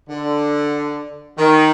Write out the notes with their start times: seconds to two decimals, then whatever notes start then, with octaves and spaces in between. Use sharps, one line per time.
0.09 D3
1.38 D#3